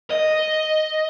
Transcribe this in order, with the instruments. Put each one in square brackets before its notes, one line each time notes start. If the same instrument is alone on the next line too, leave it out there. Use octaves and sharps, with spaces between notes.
[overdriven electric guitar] D#5